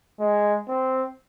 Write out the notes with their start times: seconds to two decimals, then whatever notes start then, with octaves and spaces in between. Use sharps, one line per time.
0.20 G#3
0.69 C4